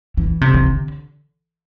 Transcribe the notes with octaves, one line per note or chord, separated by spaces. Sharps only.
E3
C3
E3
D3